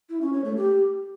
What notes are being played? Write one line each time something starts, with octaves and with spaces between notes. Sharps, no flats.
E4
C#4
C#5
A3
G4